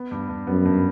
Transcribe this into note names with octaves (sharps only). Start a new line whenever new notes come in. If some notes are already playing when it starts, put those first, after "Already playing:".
Already playing: B3
G2
G2
F#2 B3
G2